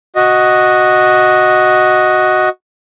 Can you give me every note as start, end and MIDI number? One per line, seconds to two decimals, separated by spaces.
0.16 2.49 66
0.16 2.49 75